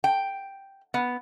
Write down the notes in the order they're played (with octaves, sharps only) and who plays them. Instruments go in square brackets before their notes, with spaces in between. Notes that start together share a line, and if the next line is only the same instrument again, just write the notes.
[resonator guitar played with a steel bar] G5
B3